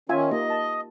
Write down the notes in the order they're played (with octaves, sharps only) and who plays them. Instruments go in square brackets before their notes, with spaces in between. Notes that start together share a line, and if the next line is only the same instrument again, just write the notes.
[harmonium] D#3 C#4 [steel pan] F4 E5 G#5
[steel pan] A#3 D#4 G4 [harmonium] D#5
[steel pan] A5